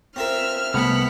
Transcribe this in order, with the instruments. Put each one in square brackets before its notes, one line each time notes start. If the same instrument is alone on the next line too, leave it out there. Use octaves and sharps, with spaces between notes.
[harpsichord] C4 F4 A#4 [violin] E5 [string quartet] F6
[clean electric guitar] C2 A3 B3 [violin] F#5 B5